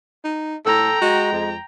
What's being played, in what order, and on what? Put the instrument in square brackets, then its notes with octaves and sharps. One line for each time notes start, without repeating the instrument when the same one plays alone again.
[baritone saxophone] D#4
[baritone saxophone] A2 [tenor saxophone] A4 [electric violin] G5 A#5
[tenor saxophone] G#3 [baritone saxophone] F#4
[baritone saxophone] F2